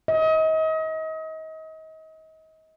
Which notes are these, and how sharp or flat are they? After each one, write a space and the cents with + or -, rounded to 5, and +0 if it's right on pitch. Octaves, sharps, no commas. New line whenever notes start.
D#5 +35